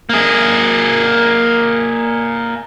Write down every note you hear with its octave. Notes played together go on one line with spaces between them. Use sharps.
A#3 G#4